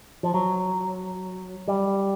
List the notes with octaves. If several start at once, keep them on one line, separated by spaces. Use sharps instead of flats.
F3
F#3
G3